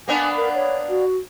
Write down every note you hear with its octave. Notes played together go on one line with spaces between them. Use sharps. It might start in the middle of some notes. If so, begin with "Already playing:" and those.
A#3 B3 D4 G#5
A#4
C#5
F#4